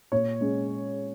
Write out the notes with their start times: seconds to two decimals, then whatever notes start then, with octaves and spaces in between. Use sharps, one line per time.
0.12 A#2 C#5
0.41 G#3 C#4